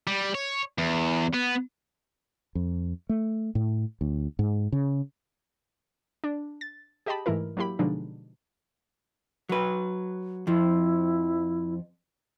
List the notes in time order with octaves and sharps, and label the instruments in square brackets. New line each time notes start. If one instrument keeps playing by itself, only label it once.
[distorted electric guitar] G3
C#5
E2
B3
[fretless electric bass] F2
A3
A2
D2
G#2
C#3
[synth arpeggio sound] D4
A6
G4 G#4 D#5 G5 A5 B5
G#2 E3 A3 E4 A#4
F#3 A#3 E4 G4 B5
B2 D3 F3 G#3 D4 D#4
[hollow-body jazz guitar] F#3 B4
[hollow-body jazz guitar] F2 F3 [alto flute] E4